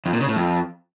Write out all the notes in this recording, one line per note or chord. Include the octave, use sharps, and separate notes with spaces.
F2
A#2
C#3
A2
F2